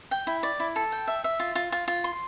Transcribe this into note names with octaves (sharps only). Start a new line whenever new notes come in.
G5
E4
D5
E4
A4
G5
E5
E5
F4
F4
F4
F4
C6